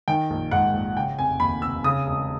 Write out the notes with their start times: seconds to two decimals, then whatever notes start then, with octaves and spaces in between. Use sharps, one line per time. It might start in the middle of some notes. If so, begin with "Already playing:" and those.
0.08 D#3 G5
0.30 A#1
0.51 G#2 F#5
0.74 A#1
0.96 C#3 G5
1.19 F1 G#5
1.40 D#2 B5
1.62 F1 E6
1.84 C#3 D#6
2.07 E1